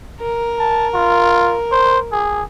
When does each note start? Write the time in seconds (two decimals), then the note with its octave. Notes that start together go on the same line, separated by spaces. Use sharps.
0.20 A#4
0.59 A5
0.94 F4
1.72 C5
2.12 G#4